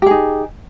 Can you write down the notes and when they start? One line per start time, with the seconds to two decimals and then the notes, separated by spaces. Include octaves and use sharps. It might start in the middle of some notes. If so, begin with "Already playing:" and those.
0.02 G4
0.06 G#4
0.11 D#4